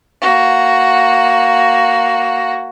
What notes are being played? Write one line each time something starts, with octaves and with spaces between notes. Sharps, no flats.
A#3 F#4